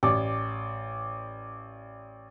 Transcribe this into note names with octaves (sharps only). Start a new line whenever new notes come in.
A1 D5